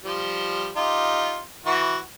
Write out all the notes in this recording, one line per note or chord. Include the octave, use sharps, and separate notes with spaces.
F3 G3
D#4 F4 G4
E3 F#4